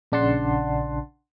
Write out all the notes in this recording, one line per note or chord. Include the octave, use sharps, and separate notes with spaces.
A#1 C#3 D4 F#5 A5 C6